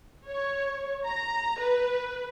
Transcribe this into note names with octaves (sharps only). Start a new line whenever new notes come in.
C#5
A#5
B4